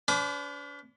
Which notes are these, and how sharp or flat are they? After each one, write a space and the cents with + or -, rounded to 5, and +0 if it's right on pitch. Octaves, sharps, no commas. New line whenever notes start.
D4 -45 B4 +40 D6 +0